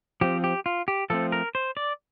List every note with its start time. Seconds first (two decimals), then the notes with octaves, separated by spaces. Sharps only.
0.21 F3 C4 G4
0.44 G4
0.66 F4
0.88 G4
1.10 F3 A3 C4 A4
1.32 A#4
1.55 C5
1.77 D5